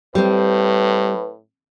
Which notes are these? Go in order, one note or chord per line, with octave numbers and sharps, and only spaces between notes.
A2 G3 C4 B4